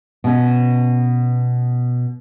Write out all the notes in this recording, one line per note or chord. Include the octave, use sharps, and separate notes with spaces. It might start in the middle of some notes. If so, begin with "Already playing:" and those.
B2 C#4